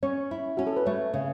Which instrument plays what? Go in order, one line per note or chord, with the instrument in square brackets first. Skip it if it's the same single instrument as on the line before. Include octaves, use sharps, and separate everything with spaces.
[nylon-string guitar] C#4 [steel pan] C#5
[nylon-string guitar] E4
[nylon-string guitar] C#4 [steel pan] F#4
[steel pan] A4
B4
[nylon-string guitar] A3 [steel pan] C#5
[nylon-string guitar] C#3